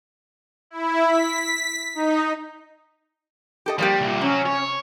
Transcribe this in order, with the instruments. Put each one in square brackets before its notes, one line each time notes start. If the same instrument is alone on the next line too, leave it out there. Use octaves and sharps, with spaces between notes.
[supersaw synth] E4
B6
D#4
[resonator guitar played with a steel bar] G4 A4 D#5
[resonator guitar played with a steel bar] F3 A#3 G4 [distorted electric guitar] G3
[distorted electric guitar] C2 A#2
[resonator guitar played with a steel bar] C3 [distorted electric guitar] F#3 [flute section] C#4
[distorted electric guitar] C#5